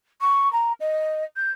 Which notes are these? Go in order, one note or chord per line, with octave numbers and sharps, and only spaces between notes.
C#6
A#5
D#5
G6